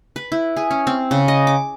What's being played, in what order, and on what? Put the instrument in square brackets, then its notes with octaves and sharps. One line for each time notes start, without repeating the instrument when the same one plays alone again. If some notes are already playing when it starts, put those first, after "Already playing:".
[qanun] B4
E4
G#4
C#4
C4
C#3
D#5
D6